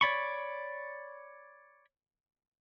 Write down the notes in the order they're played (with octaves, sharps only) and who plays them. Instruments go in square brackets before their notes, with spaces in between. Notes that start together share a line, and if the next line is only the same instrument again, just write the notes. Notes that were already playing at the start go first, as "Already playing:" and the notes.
[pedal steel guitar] C#5 D5 B5 C#6